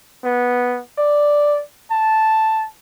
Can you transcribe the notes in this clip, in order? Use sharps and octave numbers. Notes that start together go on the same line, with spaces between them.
B3
D5
A5